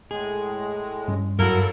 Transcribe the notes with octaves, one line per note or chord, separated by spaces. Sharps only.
A2 G#3 G#4
G2 G3 C#4
F#2 F#3 A#3 E4 F#4 A4 A#4